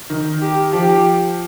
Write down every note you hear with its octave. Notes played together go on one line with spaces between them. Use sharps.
D#3
G4
F3 G4